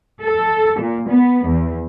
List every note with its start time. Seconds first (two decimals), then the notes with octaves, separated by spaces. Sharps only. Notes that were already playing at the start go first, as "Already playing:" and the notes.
0.22 A4
0.80 A#2
1.10 B3
1.47 E2